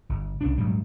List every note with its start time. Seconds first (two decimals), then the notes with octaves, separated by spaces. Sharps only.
0.09 G1
0.41 C2 C#4 D4
0.58 D#1 G#2 F#3 G3